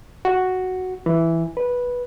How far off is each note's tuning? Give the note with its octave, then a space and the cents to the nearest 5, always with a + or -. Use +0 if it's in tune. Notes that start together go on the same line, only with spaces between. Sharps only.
F#4 +0
E3 +5
B4 -10